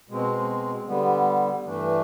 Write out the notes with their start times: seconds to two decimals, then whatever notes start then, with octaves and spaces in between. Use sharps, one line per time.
0.09 B2 G#3 C4
0.87 D3 G3 B3
1.65 G2 E3 A3 D4